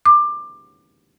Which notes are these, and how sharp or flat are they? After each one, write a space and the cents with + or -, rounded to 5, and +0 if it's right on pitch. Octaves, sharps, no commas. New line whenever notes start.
D6 +20